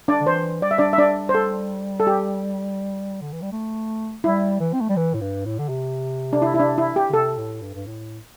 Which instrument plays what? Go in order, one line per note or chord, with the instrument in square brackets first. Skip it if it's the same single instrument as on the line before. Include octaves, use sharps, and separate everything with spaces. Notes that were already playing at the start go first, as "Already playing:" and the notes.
[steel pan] D4 D5
[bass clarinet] D3
[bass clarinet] E3 [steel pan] C5
[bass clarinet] G3 [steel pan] D5
[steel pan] E5
D4 D5
E5
D4 D5
C5
A4
A4
G4
[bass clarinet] D3
E3
G3
A3
[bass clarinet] G3 [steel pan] E4
[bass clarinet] E3
C4
A3
G3
E3
A2
G2
A2
D3
C3
[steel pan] D4
E4
E4
D4
E4
G4
[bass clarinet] D3
[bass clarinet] C3 [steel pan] A4
[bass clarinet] A2
G2
G2
A2